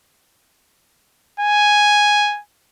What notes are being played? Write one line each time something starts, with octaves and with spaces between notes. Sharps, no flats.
G#5